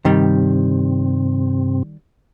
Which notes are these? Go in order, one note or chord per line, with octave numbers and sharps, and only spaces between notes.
G2 C3 D#3 G3 C4